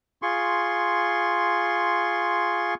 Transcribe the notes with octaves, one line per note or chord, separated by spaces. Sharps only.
F4 G#4 C6 C#6